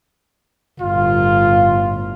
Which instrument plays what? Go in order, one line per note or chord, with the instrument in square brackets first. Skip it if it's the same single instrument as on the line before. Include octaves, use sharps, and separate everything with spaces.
[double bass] G1 A2 [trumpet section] F4